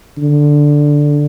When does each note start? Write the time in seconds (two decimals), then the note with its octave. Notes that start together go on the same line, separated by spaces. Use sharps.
0.18 D3